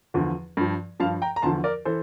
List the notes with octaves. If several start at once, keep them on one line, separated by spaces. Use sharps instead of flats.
E2 D3 F3
G2 F3
G2 F3 F5 A5
G5 A#5
A#5
E2 D3 F3 A5 C6
A#4 D5
E3 A4 C5